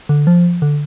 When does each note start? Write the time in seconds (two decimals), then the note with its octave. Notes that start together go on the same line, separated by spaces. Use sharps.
0.09 D3
0.27 F3
0.62 D3